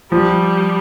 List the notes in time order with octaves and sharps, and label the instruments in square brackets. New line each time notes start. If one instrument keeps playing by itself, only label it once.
[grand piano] F3 [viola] G3